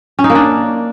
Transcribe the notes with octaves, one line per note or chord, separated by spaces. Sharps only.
C#4
D#4
A#3
D4